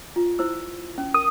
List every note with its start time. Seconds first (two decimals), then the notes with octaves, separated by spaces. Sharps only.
0.16 F4
0.39 E4 C5 E6
0.98 C#4
1.14 A#4 D#6